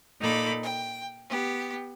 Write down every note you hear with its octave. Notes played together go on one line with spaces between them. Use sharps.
A#2 D#4 A4 B5 D6
G5
B3 G4